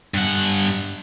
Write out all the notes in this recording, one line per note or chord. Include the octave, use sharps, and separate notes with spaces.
G2 F#5